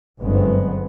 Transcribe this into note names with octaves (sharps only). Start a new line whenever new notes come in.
G1 F#2 F3 G#3 B3 C4